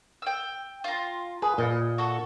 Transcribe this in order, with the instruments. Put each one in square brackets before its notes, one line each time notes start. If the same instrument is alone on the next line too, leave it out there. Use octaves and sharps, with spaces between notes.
[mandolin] G5 E6
F4 A#5
[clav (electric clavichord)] G#4 [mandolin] B4
[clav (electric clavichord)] A#2 [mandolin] D#5
[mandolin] F#4 A4